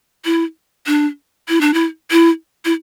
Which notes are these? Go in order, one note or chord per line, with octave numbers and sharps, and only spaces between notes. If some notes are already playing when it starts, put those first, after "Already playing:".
E4
D4
E4
D4
E4
E4
E4